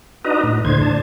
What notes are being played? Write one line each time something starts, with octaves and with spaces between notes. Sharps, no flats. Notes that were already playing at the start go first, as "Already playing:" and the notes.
D4 D#4 F#4 B4 D#5 A#5
A2
D2 A2 D3 C5 G#6
A2 D4 A5